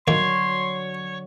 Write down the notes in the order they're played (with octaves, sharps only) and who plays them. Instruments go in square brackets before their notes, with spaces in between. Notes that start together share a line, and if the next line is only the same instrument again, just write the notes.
[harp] D3 F#3 [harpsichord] D#3 A#3 [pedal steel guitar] C#5 [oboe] C6